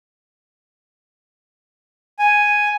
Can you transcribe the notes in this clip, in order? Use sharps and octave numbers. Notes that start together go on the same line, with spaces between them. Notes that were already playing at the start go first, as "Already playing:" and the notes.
G#5